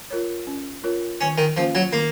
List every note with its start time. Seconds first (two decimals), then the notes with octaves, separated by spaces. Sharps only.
0.10 F4 A#4 C#5
0.47 C#4
0.84 F4 A#4 C#5
1.21 D#3 C#4
1.38 D#3
1.57 F3 A#3 C#4 F4
1.75 F#3
1.93 D#3 A#3